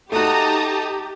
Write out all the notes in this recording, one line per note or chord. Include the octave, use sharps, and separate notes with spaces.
A3 D#4 F#4 G4 A5 A#5 D#6